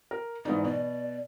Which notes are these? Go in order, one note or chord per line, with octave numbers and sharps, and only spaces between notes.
A#4
G#2 E3 D#4 D5
B2 D5